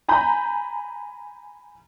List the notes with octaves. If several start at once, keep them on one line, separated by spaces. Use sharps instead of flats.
G#5 A#5 B5 G6